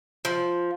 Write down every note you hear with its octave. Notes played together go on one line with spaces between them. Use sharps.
F3